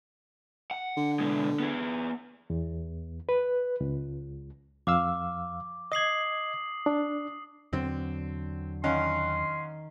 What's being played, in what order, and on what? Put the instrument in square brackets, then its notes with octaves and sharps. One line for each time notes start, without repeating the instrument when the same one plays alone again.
[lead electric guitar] F#5
[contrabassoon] D3
[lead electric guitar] B2 G#3
B3 G#4
[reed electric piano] E2
B4
C#2
[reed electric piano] F2 F5 E6 [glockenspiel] D6
[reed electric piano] D#5 G#6 [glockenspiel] D#6 C7 F#7
[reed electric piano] D4
[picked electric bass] E2 D3 F#3 [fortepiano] C4
[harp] D#3 [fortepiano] C#4 F5 F#5 [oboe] C6